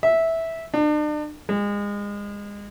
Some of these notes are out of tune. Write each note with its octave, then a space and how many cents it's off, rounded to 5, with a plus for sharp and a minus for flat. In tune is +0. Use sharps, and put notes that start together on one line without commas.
E5 -10
D4 +40
G#3 -30